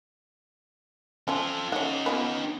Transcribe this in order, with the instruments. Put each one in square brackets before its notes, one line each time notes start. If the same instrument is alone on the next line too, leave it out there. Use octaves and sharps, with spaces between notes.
[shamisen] F3 C#4 [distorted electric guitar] F4 A4
[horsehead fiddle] C#4 [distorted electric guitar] D#4 G4 [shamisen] C#5 F#5
[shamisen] B3 F4 B4